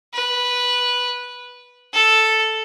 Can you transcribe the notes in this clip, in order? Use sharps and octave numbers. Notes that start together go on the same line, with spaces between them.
B4
A4